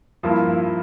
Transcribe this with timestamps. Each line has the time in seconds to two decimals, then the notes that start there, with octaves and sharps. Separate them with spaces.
0.23 G2 F3 A#3 E4